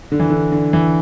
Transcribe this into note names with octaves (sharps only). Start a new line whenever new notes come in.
D3
E3
D3
D3
E3